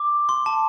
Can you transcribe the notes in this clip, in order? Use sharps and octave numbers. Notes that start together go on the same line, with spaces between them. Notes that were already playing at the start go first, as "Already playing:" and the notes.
Already playing: D6
C6
A5